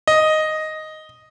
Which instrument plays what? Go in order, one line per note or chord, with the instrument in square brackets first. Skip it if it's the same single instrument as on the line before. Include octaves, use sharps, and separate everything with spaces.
[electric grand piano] D#5